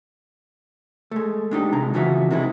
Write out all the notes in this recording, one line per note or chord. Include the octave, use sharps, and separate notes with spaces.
G#3 A3
G#3 D4 D#4 G4
C3 D#3 G#3 A#5
F2 C#3 E3 F4 F#4 E5
C3 D#3 G#3 D#4 E4